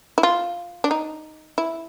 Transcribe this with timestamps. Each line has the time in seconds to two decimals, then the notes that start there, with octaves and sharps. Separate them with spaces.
0.18 E4
0.23 F4
0.84 D4
0.91 D#4
1.58 E4